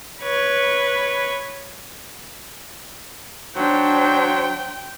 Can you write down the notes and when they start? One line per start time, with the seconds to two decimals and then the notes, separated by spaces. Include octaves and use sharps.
0.22 B4 C#5
3.56 F#3 D4 C5 G5